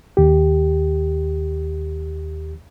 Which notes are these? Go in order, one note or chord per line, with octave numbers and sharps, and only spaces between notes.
D#2 G4